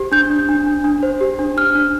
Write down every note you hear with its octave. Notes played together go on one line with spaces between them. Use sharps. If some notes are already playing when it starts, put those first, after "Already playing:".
Already playing: G4 C5
D4 G6
D4
D4
D4
D4
C5
G4
D4
D4 F6
D4